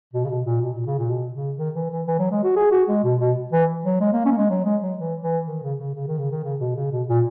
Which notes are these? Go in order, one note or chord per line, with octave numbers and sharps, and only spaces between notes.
B2
C#3
B2
A#2
B2
A#2
C#3
A#2
B2
C#3
D#3
E3
E3
E3
F#3
G#3
F#4
G#4
F#4
G#3
B2
B2
E3
F#3
G#3
A#3
C#4
A#3
G#3
F#3
G#3
F#3
E3
E3
D#3
C#3
C#3
C#3
D#3
C#3
D#3
C#3
B2
C#3
B2
A#2